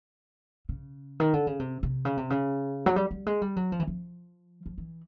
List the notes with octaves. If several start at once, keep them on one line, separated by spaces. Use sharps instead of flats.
C#3
D#3
D3
C#3
C3
C3
C#3
C3
C#3
F#3
G3
G3
G#3
G3
F#3
F3
E3
F3
F3
E3